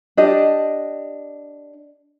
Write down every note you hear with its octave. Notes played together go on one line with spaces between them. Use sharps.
D4 G4 D#5